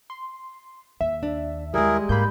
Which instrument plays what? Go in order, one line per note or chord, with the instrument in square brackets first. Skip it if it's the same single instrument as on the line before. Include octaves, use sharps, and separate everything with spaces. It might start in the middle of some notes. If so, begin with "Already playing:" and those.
[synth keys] C6
[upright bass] D#2 [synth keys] E5
[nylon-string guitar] D4
[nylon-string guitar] G3 G#3 [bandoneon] E4 G#4 A#4
[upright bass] G#2 [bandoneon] A#3 [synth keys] B5 G6